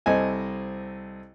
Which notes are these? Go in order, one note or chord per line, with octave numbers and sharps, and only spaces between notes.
C2 C4 A4 D#5 G#5